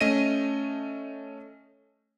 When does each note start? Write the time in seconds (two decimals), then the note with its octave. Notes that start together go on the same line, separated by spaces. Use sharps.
0.01 A3 C#4 D#5 A#6 D#7